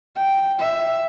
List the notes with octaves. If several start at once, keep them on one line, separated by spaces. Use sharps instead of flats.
G5
E5